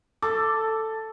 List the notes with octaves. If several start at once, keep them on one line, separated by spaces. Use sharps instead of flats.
A4 D6